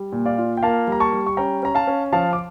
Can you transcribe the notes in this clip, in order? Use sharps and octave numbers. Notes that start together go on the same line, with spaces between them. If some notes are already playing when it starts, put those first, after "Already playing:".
Already playing: G3
A#2
D5 F5
F4
G5
A#3 F5 A5
G3 A#5
A5 C#6
G3
C#6
C#4 G5 A#5
C#4 A#5
F5 A5
C#4
F3 F5 A5
D6